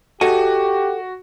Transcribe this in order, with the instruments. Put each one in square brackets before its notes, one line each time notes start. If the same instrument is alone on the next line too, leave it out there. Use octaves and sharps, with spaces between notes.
[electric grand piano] F#4 [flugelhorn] G4 [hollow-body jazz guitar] A4 D#5 G#5